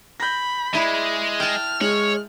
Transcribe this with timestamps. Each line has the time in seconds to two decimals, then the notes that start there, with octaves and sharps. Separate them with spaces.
0.20 B5 G6 A#6
0.73 G#3 E4 D5
1.40 G5 A5 F6
1.81 G#3 C#5 F#7